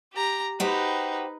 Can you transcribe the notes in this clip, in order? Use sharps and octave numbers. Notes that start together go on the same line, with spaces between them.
G4 A#5
D#4 F#4 G4 B4 C5